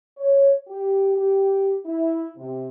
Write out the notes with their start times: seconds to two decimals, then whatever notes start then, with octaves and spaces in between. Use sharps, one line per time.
0.17 C#5
0.68 G4
1.14 G4
1.85 E4
2.37 C3